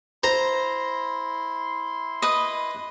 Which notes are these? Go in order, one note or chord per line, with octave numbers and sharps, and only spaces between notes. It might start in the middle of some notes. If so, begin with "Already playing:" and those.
E4 C5 A#5 C6
B4 D#5